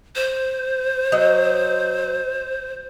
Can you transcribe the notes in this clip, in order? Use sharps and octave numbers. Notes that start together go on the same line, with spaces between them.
C5
F#3 D#5